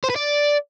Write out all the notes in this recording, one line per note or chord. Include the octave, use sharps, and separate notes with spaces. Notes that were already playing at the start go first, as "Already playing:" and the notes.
C5
B4
D5